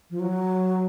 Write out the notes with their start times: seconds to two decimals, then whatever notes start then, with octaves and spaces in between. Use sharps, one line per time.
0.10 F3
0.20 F#3